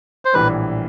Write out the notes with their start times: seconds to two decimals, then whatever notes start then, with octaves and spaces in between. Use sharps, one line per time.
0.25 C5
0.34 A#1 A2 E3 G3 B4